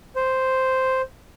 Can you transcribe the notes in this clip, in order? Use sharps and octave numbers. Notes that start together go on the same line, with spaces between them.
C5